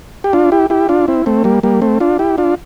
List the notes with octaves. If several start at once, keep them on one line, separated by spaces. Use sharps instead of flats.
G4
D4 F4
E4 G4
E4 G4
D4 F4
C4 E4
A3 C4
G3 A#3
G3 A#3
A3 C4
D4 F4
E4 G4
D4 F4